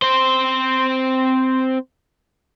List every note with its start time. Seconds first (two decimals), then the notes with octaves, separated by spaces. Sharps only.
0.02 C4 C5